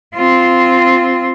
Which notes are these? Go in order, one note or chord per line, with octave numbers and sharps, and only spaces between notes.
C4 F4